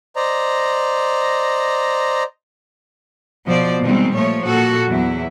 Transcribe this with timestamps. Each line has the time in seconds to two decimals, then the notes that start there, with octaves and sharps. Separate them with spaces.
0.16 C5 D5 D#5 A#5
3.46 B2 F3 C5 D5
3.82 B2 D#3 G3 G#3 C4
4.15 A#2 F3 A3 C#5
4.44 A#2 F#4 A4
4.90 E2 F#3 E4